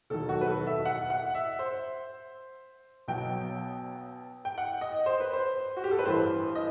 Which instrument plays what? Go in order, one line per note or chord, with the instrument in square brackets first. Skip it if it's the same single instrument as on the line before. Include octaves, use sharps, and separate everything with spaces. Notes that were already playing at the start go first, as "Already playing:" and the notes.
[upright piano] E1 D#2 D#3 F#3 A4
F#4
B4
A4
E5
F#5
F#5
E5
C5
B1 B2 F#3 G5
G5
F#5
D#5
C5
B4
C5
F#4
G4
A4
B4
A1 G2 E3 C5
D#5